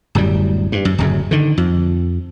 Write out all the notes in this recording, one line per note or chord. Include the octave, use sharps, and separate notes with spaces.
D1 F#2 A2 G3
G2
F#2
D1 F#2 C#3
D3 D#3
F2